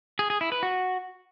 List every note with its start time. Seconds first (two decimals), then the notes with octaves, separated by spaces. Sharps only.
0.19 G#4
0.30 G#4
0.41 E4
0.52 B4
0.63 F#4